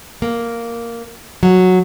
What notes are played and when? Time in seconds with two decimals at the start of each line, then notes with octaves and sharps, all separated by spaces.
0.22 A#3
1.43 F#3